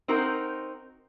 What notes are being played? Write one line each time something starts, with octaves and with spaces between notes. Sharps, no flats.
C4 D#4 F#4 A#4